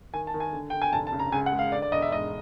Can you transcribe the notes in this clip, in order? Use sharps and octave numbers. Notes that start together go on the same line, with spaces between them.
D#3 G#5
A5
D#3
G#5
D3
D3 G5
G#5
F1 A5
A5
C#3
A#5
C#2 G#5
F#5
G#3
F5
D3 D5
D5
E1 D#5
E5
G#2 D#5